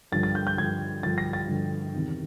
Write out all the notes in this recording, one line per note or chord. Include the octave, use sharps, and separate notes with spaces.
G2 D3 F3 A6
A6
G6
G6
G2 D3 F3 G#6
G2 D3 F3 A6
A#6
A6
G2 D3 F3
E2 C3 D#3